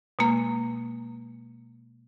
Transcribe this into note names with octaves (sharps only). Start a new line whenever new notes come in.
B2 G#3 A#3